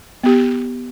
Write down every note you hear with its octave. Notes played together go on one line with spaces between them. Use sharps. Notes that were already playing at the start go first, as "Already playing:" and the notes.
B3 G4